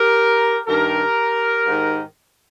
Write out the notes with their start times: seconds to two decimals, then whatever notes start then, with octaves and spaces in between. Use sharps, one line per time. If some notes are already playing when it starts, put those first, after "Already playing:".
Already playing: G4 A#4
0.67 G2 D#3 G4 A#4
1.65 G#2 D#3